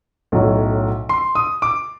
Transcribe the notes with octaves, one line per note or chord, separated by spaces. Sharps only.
B1 A2 F#3
C6
D#6
D6